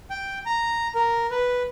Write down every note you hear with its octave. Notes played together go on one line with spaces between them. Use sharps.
G5
A#5
A#4
B4